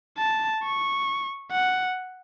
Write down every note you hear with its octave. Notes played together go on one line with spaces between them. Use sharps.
A5
C#6
F#5